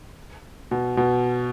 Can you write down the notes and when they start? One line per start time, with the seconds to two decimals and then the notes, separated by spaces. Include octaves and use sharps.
0.71 B2
0.97 B2